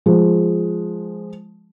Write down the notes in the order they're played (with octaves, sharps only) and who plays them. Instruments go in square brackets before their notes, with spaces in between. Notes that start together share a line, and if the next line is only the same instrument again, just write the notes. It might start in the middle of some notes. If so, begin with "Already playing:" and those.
[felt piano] F3 G#3